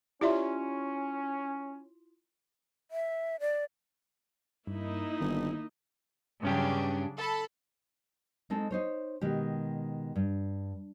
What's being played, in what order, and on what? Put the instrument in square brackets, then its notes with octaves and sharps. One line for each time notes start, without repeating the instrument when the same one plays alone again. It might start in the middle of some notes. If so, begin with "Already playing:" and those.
[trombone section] C#4 [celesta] E4 F4 C6 [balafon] G4 D5 E5
[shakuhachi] E5
D5
[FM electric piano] G2 [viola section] A#3 D#4 E4
[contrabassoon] G1 [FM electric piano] D#3
[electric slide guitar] G2 C#4 G4 [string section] C#3 F#3 D4
[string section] A4 A5 B5
[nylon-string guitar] G#3 C4 D#4 A4
D#4 C5 C#5
B2 D#3 G#3 G4
G2